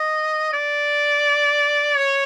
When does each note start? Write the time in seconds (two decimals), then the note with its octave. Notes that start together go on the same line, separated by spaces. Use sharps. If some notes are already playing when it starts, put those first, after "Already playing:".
Already playing: D#5
0.53 D5
1.97 C#5